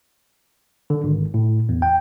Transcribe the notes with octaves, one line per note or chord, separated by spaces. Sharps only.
D3
G#1
A2
E2
G5